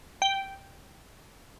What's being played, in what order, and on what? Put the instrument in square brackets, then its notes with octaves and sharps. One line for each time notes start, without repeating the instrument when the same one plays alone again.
[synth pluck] G5